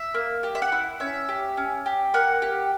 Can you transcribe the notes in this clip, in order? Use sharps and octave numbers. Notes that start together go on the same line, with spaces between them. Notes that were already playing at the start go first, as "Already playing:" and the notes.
Already playing: E5
A#3
G4
E5
F#5
E4
C#4 E5
G4
C#4
G4
A#3 F#5
G4